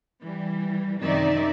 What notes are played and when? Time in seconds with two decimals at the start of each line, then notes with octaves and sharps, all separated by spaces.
0.22 E3 G3
1.01 F#2 C3 D#3 D#4 D5 E5